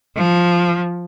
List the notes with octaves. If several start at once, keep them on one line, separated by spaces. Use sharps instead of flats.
F3